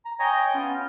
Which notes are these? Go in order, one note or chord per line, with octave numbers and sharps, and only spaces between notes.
A#5
C#5 D#5 G5 G#5 A#5
B3 C#4 F4
F6